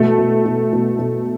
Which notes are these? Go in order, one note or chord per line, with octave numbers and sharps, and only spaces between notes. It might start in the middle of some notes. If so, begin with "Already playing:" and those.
Already playing: B2 A3
B2
B2
B2
B2